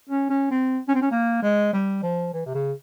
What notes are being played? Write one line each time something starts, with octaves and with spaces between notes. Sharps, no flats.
C#4
C#4
C4
C#4
C4
C#4
A#3
G#3
G3
F3
E3
C3
C#3